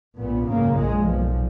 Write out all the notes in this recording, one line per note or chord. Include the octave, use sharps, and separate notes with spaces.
A#1 A#2 B3
G#1 F#2 C#3 A#3
A#1 A#2 G#3
B1 A#2 F3